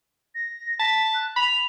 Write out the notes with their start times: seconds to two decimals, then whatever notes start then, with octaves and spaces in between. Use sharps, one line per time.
0.35 A#6
0.79 A5 B6
1.15 F#6
1.36 B5 F7